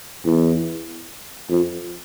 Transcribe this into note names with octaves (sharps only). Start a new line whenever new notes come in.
E2
F2